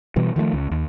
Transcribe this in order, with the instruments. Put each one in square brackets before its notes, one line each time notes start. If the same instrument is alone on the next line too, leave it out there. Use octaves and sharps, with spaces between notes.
[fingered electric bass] B2 E3 G3
D#3 F3 F#3 A3
C#2
D#2